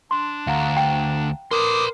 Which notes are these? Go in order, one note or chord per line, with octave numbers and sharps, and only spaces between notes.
D4 C6
D2 F5 F#5 A#5
G5
A#4 B4 C6 D6 D#6 C7